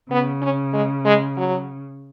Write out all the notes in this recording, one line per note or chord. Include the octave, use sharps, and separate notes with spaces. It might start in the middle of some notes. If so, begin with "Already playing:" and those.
C#3 B3
C#4
G#3
G#3
F#3